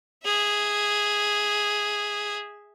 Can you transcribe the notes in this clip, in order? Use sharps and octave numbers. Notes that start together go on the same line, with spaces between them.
G#4 E5